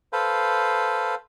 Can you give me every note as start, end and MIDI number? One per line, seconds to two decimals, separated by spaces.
0.13 1.15 69
0.13 1.15 71
0.13 1.15 72
0.13 1.15 77